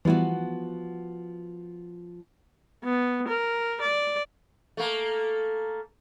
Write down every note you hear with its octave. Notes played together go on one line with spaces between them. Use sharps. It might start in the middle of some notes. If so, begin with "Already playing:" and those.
E3 F3 G3 B3 E4 F#4
B3
A#4
D5
A3 A#3